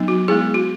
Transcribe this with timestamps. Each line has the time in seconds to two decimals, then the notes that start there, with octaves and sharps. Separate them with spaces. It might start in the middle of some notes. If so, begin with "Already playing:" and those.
Already playing: F#3 B3 D#4
0.08 F#4
0.28 G#3 B3 E4 G#4
0.54 F#4